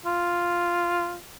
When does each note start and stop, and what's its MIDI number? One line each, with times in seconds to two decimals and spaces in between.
0.06 1.16 65